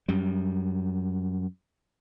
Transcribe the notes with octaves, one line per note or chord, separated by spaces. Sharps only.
F#2 G3